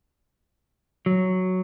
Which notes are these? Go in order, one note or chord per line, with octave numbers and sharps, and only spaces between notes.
F#3